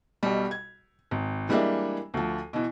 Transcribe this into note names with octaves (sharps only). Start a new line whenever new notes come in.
B1 B2 G3
G#6
G#1
E3 G3 G#3 A#3 D4 E5
D2 F3
B2 E3